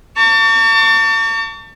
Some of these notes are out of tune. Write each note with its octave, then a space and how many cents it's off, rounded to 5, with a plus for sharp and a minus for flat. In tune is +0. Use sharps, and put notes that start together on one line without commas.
A5 +40 C#6 +40